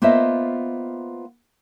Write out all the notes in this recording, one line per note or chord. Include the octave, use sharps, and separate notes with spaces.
A#3 B3 F4 C5 D#5 E5